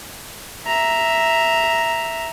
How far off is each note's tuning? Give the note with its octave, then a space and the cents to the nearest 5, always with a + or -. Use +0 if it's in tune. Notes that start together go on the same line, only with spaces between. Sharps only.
E5 +0 A#5 +0